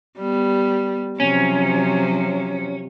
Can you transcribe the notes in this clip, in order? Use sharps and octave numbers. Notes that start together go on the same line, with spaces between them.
G3 B3
C3 F3 F#3 C#4